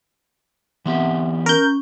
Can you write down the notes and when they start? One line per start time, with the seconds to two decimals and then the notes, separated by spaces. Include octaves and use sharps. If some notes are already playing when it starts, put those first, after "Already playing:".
0.86 E3 B3 C4 G4 E5 F#5
1.46 C#4 A#4 G6